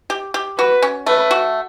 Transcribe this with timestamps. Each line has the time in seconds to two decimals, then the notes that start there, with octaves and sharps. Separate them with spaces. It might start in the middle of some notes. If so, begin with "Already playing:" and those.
0.10 G4
0.34 G4
0.58 F#4 B4
0.82 C#4
1.06 A3 B4
1.31 F#4